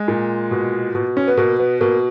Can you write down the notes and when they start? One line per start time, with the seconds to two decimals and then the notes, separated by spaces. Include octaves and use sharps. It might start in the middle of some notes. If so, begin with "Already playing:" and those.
Already playing: G#3
0.08 A#2
0.51 B2
0.95 B2
1.17 C#4
1.28 B3
1.37 B2 A#3
1.59 B3
1.81 B2 A#3